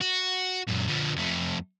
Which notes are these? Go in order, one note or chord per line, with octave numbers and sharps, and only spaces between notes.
F#4
F#2 A#2
D3 F3
F2 A3